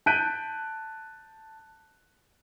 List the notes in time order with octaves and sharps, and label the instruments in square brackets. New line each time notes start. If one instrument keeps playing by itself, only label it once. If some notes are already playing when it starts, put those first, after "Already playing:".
[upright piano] A5 F#6 G6 B6 D7 D#7